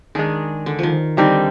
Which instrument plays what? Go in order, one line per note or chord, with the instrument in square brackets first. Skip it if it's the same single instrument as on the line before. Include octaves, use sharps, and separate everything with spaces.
[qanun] D#3 [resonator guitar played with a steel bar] G#3 D4 G#4
[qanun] D3
D#3 F3
[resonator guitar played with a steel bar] D3 G3 C4 D#4